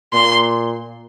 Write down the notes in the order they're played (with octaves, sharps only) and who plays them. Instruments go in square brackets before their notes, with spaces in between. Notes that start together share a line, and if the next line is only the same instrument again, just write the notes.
[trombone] A#2 [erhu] C6